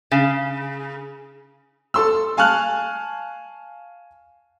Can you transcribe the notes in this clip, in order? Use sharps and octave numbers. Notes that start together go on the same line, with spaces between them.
C#3
A4 C6 E6
F5 G#5 A5 C#6 F6 F#6